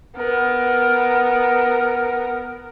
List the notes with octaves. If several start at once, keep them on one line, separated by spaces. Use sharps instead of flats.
B3 A#4